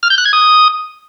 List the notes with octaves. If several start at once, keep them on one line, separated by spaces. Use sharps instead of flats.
F6
G6
F#6
G#6
D#6